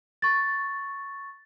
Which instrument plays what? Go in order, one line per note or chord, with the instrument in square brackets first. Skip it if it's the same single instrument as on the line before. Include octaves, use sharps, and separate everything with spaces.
[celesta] C#6 A6